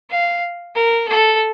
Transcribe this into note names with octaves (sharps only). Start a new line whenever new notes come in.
F5
A#4
A4